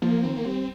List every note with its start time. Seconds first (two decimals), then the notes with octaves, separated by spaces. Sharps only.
0.02 F3 A#3
0.23 D#3 C4
0.37 A#3
0.45 G3 C4